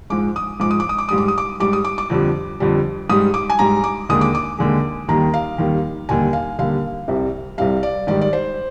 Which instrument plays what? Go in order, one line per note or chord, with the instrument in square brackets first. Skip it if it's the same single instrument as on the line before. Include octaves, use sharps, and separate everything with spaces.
[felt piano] G#2 F3 G#3 D6
D#6
G#2 F3 G#3 D6
D#6
D6
D#6
D6
G#2 G3 D#6
D6
D#6
D6
G#2 G3 D6
D#6
D6
D6
F2 D3 G3
F2 D3 G3
G#2 G3 D#6
D6
G#5
G#2 G3 A#5
D6
D#2 D3 G#3 D#6
D6
D6
D#2 D3 G#3
D#2 D#3 G3 A#5
F5
D#2 D#3 G3
D#2 D3 G3 G#5
F5
D#2 D3 G3 F5
C2 C3 G3
C2 C3 G3 F5
D5
G#2 D#3 G3 D5
D5
C5